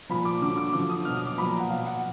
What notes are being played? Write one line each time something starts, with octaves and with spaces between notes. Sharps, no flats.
A#2 F3 B5
D6
D3 F#3 D6
D6
D3 F3 D6
D#6
B2 F#3 F6
D#6
D6
A#2 F3 B5
A#5
F#5
B2 F#3 F5
F#5